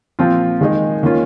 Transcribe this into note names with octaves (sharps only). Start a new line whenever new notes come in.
A#2 F3 C4 F4
D#3 G#3 D#4 G#4
D#3 A#3 C#4 F4